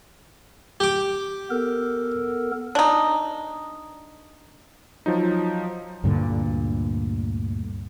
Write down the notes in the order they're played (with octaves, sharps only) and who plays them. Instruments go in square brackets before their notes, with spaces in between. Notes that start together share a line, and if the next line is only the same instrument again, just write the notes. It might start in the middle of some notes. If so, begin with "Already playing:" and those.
[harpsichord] G4 D6
[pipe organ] B3 A4 A#4
[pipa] D4 D#4
[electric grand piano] F3 F#3 D#4
[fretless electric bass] D2 G2 A#2 D3